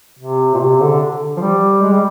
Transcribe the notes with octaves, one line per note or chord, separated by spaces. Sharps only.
C3
A#2
C3
D3
F3
G3
G#3
G3